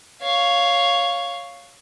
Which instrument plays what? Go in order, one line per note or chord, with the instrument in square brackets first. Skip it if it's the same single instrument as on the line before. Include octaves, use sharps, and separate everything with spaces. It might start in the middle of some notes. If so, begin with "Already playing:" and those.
[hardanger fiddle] C#5 F5